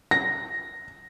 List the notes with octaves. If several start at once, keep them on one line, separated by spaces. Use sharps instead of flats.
A#6